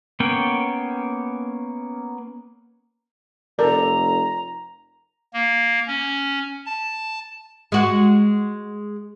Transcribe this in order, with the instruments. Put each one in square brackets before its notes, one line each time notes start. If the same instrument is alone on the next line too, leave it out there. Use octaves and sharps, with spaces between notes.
[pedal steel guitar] A#3 B3 C#4 C#5 G5
[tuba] F1 [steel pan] A4 D5 [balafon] A#4 [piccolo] A#5
[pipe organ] A#3
C#4
A5
[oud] G#3 F#4